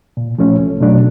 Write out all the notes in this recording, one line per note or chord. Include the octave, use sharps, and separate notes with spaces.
A#2
F3 A3 C#4
C2
B2 F#3 A3 D4